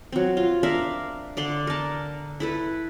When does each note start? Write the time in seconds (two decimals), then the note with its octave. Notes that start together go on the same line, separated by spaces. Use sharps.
0.12 F#3 C4
0.37 F4
0.63 D4 A#4 E5 F5
1.37 D3 D5 C6
1.67 A#4 A5
2.40 E4 A4 B4